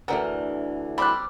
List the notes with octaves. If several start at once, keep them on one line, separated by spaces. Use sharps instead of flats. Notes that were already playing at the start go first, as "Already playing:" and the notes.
D2 D3 E3 A#4 F#5 G5
G3 C4 D4 B5 F#6